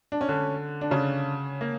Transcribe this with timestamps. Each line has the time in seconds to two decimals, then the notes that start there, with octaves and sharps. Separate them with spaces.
0.12 D4
0.21 C#4
0.29 D3 D4
0.81 D4
0.90 C#3 C#4
1.61 A#3